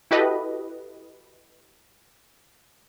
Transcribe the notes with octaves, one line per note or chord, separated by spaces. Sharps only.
E4 F#4 G4 A4 B4 D#5